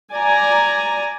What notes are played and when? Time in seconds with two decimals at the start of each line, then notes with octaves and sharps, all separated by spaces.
0.13 D5 G#5 A#5